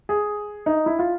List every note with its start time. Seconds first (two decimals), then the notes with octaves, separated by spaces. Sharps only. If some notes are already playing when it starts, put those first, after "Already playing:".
0.09 G#4
0.66 D#4
0.86 E4
0.99 F4